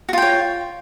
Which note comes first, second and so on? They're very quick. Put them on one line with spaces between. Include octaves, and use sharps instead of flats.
F#4 F4 G5 C#5